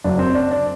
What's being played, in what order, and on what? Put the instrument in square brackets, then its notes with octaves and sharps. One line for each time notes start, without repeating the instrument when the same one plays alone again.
[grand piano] F#1 F#2 F#3 D4
C4
D4
D4